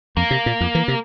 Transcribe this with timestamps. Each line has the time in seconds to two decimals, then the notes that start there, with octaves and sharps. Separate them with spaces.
0.17 F2 A#3
0.31 C3
0.46 A#2
0.61 F2
0.75 E3
0.88 C3